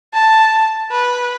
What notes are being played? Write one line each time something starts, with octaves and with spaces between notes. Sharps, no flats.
A5
B4